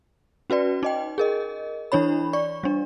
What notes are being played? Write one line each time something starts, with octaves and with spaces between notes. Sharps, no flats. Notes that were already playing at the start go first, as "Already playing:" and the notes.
C#4 F#4 B4 D5
D#4 D#5 G5
G#4 A#4 D#5
E3 D4 E4 C#5 B5
D5 C#6
G3 D4